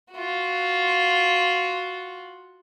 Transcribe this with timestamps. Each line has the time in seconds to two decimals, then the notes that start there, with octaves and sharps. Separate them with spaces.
0.12 F4 F#4